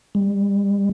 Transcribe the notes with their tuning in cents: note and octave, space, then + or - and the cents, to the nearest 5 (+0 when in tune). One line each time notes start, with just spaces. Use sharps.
G3 +35